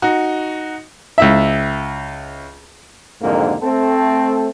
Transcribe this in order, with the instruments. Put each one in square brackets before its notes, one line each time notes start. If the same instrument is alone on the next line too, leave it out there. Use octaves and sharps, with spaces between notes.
[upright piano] D#4 F#4
[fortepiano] C#2 E4 E5
[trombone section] C2 F2 G#2 D3 D#3 A#3
A3 C4 A4